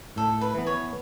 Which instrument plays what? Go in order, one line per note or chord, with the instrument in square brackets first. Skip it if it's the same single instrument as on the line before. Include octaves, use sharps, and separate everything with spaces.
[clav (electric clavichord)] A2 [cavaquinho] A4
[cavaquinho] B4
[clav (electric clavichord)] E3 B3
[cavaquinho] C#5